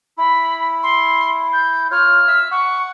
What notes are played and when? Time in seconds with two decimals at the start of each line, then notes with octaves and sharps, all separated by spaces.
0.18 E4 B5
0.83 C6
1.53 G6
1.91 F4 C#5 F6
2.28 E5 E6
2.51 F#5 C#6